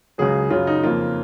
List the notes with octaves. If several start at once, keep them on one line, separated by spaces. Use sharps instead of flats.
C#2 C#3 F#3 G#4
F#2 C#3 F#3 F4
D#4
F2 C#3 F3 A#3 F4